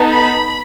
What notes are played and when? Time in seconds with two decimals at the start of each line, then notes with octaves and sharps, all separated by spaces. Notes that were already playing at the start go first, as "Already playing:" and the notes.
Already playing: B3 D#4 A4
0.10 B5